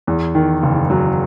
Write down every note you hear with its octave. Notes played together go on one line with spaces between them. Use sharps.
E2
D#3
F#1
F#3